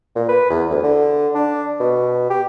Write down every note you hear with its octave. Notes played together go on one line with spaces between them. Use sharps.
A#2
B4
E2
D2
D3
D4
B2
G4